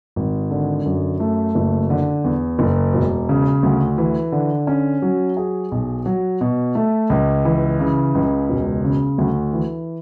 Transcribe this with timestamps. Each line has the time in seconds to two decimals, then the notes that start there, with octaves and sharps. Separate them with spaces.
0.16 G#1
0.51 D3
0.85 F#2
1.20 A3
1.55 F#1
1.90 D3
2.24 E2
2.59 F#1
2.94 E1
3.29 C#3
3.63 D2
3.98 E3
4.32 D3
4.67 C#4
5.02 F#3
5.37 G#4
5.72 B1
6.06 F#3
6.41 B2
6.75 A3
7.10 C#2
7.45 E3
7.80 C#3
8.15 C#2
8.49 E1
8.84 C#3
9.18 D2
9.53 E3